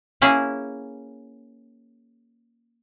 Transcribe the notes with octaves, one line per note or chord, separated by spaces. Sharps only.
A#3 C#4 E4 G#4